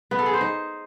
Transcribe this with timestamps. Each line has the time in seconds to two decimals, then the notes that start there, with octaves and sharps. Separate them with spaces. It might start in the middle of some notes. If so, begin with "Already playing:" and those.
0.11 B3
0.19 A4
0.26 G#4
0.33 C5
0.41 D#4